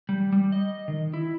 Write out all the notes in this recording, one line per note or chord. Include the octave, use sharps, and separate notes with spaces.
G3
G3
D#5
D#3
E4